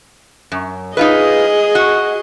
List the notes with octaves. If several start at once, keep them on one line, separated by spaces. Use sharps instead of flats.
F#2
D#4 F4 G#4 B4 D#5
F#4